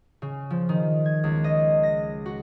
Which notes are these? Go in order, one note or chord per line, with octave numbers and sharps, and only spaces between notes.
C#3
F3
D#3
G#6
C#2
D#5
A#6
F#4